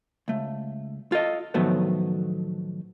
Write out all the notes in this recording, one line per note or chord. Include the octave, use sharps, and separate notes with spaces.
C#2 A3
F4 A4 D#5
A2 D#3 F3 F#3 A3 B3